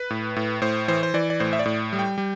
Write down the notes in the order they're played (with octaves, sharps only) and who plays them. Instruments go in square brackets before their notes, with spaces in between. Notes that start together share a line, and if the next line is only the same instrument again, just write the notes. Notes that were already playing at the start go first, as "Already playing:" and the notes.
Already playing: [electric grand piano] B4
A2
A2
A2 C5
E3 C5
C5
E3 D5
D5
A2 C5
E5
D5
A2
G3
G5
G3